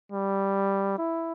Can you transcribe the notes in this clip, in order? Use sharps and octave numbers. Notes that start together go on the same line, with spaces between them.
G3
E4